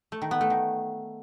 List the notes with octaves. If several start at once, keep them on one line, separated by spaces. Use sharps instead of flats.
A3
D#3
B3
A3
D#3